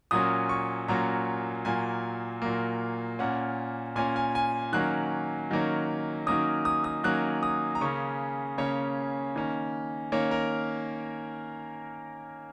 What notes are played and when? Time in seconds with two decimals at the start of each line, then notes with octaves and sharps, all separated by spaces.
0.11 A#2 F#3 A#3 C#4 D#6
0.49 C#6
0.88 A#2 F#3 A#3 C#4 A#5
1.65 A#2 F#3 A#3 G#5
2.42 A#2 F#3 A#3
3.19 A#2 A#3 C#4 F#5
3.96 A#2 A#3 C#4 G#5
4.16 G#5
4.35 G#5
4.72 D#3 F#3 A#3 C#4 F#6
5.51 D#3 F#3 A#3 C#4
6.26 D#3 F#3 A#3 C#4 D#6
6.65 D#6
6.84 D#6
7.03 D#3 F#3 A#3 C#4 F#6
7.43 D#6
7.75 A#5
7.81 C#3 A#3 C#4 C#6
8.58 C#3 A#3 C#4 C#5
9.35 D#3 A#3 C#4
10.12 D#3 A#3 C#4 C#5
10.31 A#4